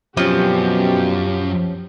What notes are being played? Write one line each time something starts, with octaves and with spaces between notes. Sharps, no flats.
F#2 B2 F3 C4 C#4 G4